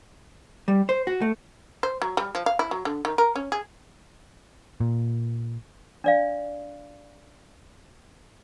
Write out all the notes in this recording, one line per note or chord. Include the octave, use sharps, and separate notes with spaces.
G3
C5
F#4
A3
C5
F#3
G3
F3
F5
E4
F#3
D3
D#3
A#4
C#4
G#4
A#2
D4 D5 F5